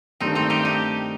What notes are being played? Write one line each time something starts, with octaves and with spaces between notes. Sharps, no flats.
G2 D#3 A3 C4 D4 D#4
C4 D#4
D#4 G4
D#4 G4